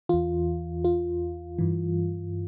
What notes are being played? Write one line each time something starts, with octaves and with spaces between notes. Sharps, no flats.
E2 E3 F4
F4
G2 E3